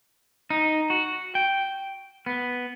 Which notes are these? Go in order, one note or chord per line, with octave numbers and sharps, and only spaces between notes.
D#4
F#4
G5
B3